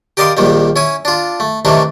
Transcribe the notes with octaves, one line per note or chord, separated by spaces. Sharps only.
G4 A#4 D5 D#5 F5 C6
A#1 A#2 D#3 G3
C#4 E4 G#5
D4 F4
A3
C3 D#3 E3 A3 D4